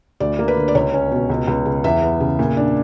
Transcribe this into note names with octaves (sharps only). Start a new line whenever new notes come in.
D2 D5
A#3
B4
D3
D5
C#2 C#5
C#4
B2
C#2
C#2
C#3
E2 E5
B3
C#3
A#2
D4